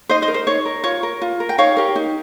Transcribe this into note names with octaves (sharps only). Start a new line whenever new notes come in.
D#4 C5 D#5
C5 D#5
A#4
C5
D#4 C#5
A#4
F4 C#5
A#4
F4
A#4
G5
D#4 C#5 F5
G4 A#4
D#4